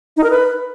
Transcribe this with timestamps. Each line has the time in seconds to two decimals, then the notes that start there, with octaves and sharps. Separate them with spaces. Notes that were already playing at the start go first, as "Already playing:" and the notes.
0.17 D#4
0.23 A#4
0.30 B4